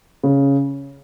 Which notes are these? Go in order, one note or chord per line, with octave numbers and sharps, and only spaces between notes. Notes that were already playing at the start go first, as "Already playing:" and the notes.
C#3